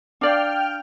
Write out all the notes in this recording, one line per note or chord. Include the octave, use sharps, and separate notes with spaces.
D4 D5 F5 G5 F6